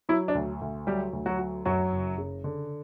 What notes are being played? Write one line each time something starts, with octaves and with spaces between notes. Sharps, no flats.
F#3 E4
D4
D2
D2
F#3 G3 G4
D2
F#3 F#4
F#3
F#2 F#3 F#4
F#1
C#3
D3